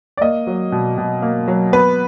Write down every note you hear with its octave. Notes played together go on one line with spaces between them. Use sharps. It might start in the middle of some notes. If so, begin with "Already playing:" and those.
D5
A#3 D#5
F#3
B2
B2
A#3
F#3
B3 B4